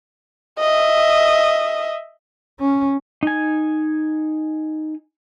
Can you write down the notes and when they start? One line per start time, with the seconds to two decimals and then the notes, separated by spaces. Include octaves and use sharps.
0.59 D#5 E5
2.60 C#4
3.23 D#4 G#5